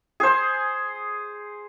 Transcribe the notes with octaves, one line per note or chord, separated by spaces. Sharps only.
G#4 C5